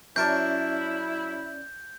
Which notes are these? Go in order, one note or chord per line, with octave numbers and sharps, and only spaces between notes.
F#2 C#4 E4 A#4 D5 A5 G6